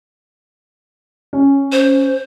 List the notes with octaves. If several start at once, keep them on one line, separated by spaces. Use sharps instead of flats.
C#4
C5